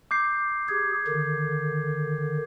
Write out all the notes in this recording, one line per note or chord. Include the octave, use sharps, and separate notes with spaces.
D6 G6 C7
G4 G#4 G#6
D3 D#3